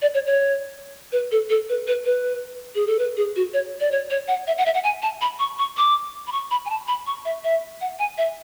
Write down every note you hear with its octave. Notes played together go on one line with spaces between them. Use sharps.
D5
C#5
C#5
B4
A4
A4
B4
B4
B4
G#4
A4
B4
G#4
F#4
C#5
D5
C#5
C#5
F#5
E5
F#5
E5
F#5
G#5
A5
B5
C#6
C#6
D6
B5
C#6
B5
G#5
A5
B5
C#6
E5
E5
F#5
G#5
E5